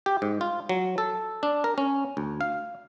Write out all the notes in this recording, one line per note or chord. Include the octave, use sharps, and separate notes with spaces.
G4
G#2
F4
F#3
A4
D4
A#4
C#4
D2
F5